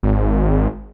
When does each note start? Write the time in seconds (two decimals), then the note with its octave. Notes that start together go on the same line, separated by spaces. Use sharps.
0.03 G#1